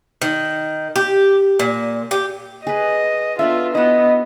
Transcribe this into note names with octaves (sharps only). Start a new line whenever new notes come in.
D#3
G4
A#2
G4
G#4 B4 D#5
B3 D4 F4 A4 E5
B3 E4 F#4 D#5